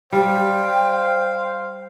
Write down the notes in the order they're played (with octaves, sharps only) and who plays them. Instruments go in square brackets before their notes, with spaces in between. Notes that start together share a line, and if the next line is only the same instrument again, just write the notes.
[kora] G3 [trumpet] C5 [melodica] F5 [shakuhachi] G5